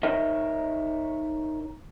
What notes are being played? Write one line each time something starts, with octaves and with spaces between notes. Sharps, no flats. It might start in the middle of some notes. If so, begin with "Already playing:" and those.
D#4 A#4 C#5 D#5 E5